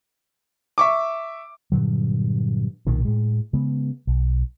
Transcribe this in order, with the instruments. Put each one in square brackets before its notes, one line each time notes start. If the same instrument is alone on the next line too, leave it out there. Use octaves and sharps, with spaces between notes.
[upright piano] E5 C#6 D6
[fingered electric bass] G2 A#2 D3 F#3
B1 A#2 D#3
A2 G#3
C#3 G#3 B3
B1